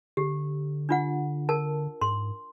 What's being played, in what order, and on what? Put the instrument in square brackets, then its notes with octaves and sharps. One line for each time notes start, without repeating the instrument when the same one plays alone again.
[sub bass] D3 [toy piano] G4
[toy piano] D4 F4 F#5
A#4 A5
[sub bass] G#2 [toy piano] C6